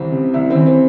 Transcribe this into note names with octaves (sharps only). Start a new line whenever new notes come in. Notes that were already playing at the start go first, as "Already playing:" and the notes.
Already playing: C2 E3 C4
C3
C2 E4
E3 C4
C4